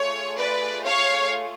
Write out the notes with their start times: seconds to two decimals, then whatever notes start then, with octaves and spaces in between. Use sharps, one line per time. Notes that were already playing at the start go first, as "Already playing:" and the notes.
Already playing: A3 F4 G#4 C#5
0.39 B4 D5
0.85 C#5 F5